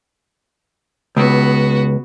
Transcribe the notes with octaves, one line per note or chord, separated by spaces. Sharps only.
C#2 B3 F#4